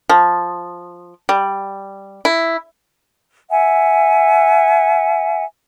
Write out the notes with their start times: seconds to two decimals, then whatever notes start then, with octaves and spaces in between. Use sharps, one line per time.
0.10 F3
1.29 G3
2.25 E4
3.50 E5 F#5 G#5